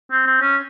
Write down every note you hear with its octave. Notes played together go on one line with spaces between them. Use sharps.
C4
C4
C#4